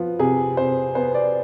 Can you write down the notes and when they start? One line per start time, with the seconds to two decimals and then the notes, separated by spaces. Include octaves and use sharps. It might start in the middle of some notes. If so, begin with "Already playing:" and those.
Already playing: F3 B3
0.19 C3 G#4
0.57 C3 C5
0.95 B3 C5
1.14 D5